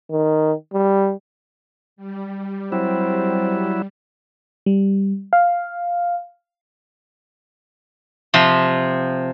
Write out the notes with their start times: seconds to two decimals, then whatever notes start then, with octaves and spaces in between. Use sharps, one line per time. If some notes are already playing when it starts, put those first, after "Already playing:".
0.11 D#3
0.74 G3
1.96 G3
2.72 F#3 C4 E4
4.66 G3
5.33 F5
8.34 C3 F3